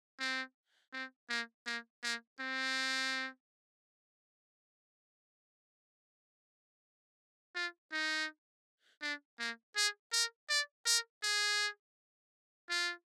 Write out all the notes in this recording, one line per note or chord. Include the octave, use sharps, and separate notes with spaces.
C4
C4
A#3
A#3
A#3
C4
F4
D#4
D4
A#3
G#4
A#4
D5
A#4
G#4
F4